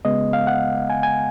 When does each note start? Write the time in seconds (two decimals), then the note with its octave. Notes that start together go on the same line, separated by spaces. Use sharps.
0.05 C#3 G#3 B3 D#5
0.33 F5
0.47 F#5
0.90 G#5
1.03 G#5